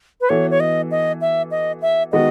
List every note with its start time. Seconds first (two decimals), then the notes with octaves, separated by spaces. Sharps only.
0.21 B4
0.29 E3 B3 F#4 A4 C#5
0.51 C#5
0.60 D#5
0.91 D#5
1.21 E5
1.51 D#5
1.82 E5
2.12 D#3 G#3 B3 F#4 D#5